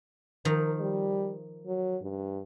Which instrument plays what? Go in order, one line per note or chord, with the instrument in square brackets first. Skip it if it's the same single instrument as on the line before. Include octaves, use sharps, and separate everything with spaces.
[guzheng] D#3 F3 [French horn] A#4
[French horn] G3
F#3
G2